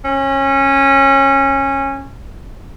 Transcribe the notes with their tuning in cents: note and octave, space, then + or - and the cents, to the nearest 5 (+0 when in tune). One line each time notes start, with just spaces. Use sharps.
C#4 -20